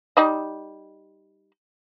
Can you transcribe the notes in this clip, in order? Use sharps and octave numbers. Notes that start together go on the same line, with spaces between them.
G3 D#4 D#5